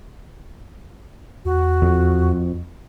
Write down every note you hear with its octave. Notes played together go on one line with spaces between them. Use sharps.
E2 F#4
F2